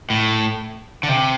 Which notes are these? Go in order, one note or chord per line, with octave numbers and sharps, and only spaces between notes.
A2
D3
C3